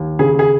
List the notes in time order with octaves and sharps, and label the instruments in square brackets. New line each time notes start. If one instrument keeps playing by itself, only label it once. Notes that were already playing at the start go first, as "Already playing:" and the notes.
Already playing: [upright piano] D#2
C#3 G#4
G#4